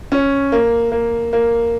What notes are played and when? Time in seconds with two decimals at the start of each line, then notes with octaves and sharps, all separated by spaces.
0.12 C#4
0.52 A#3
0.92 A#3
1.33 A#3